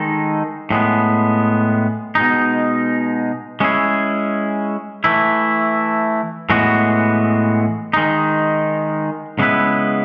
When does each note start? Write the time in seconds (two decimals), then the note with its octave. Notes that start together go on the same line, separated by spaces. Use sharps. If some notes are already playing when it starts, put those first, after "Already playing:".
Already playing: D#3 G#3 D#4 A4
0.71 A2 G#3 B3
2.15 B2 G#3 D#4
3.60 G#3 C#4 E4 G#4
5.04 E3 A3 E4
6.50 A2 E3 G#3 B3 F#4
7.93 D#3 G#3 D#4
9.39 C#3 G#3 B3 E4 B4